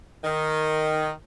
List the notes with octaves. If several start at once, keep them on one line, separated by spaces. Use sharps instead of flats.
D#3